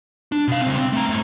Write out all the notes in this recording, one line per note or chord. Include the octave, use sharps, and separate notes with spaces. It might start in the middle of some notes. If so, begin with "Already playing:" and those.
D4
B2 F5
C#2 C4
C4
A3 A#5
G#2 A3